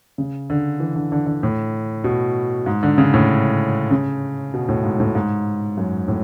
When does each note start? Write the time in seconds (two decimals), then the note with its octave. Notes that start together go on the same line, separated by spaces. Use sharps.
0.18 C#3
0.50 D3
0.80 E3
0.96 D3
1.12 D3
1.27 D3
1.43 A2
2.04 B2
2.66 G#2
2.83 D3
2.98 C#3
3.14 A2
3.91 C#3
4.54 B2
4.69 A2
4.84 G#2
5.00 A2
5.15 G#2
5.77 F#2
6.08 A2